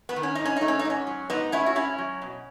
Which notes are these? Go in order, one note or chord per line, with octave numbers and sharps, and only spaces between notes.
B3
D#3
C#4
G#2 D#4
C#4
A3 D#4
C#4
D#4
G#2 C#4
F#3
G#2 B3 D#4
A3 C#4 E4
F#4
G#2 C#4 E4
F#3
B2